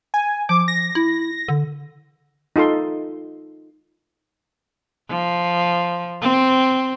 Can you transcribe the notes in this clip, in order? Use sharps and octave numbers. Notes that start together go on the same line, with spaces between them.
G#5
F3 D6
A#6
E4
D3
D#4 F4 A4 C6
F3
C4